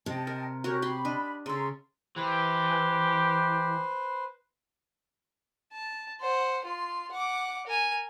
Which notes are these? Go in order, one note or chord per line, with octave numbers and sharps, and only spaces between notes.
C3 D#5 G5 A5
A#4
C#4 F#4 G4 A#4 C#5
G4 B5 C6
D4 D#5
C#3 A4 A#5 C6
E3 G4 B4 C5
A5
C5 F#5
F4 C6
F#5 D6
A#4 G#5